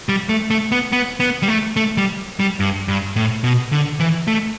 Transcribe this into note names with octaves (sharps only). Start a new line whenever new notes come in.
G3
A3
A3
B3
B3
B3
G3
A3
A3
G3
G3
G2
G2
A2
B2
D3
E3
A3